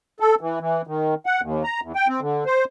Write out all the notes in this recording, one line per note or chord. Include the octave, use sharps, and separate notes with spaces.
A4
E3
E3
D#3
F#5
D#2
A#5
E2
G5
C4
D3
C5